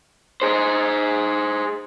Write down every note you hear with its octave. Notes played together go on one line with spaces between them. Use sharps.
G#4 C5